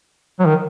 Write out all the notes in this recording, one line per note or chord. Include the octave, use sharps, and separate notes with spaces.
F#3
D#3